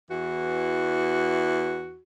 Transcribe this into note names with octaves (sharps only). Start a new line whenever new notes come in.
E2 E3 F#4